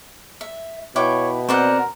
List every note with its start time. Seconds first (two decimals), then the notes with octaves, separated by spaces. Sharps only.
0.41 E5
0.96 B2 E4 C#5 G5 D6
1.49 C4 A#4 C5 D5 F#5